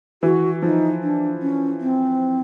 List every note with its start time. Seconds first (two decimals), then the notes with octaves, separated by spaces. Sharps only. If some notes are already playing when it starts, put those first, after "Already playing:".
0.23 E3 F#4
0.62 F3 D#4
1.02 D4
1.42 C#4
1.81 C4